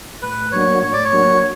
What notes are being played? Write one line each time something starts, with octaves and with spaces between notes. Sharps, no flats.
A2 B4
F#3 A#3 D4 F#4 C#5
A2 C#5
D5
C#5
F#3 A#3 D4 F#4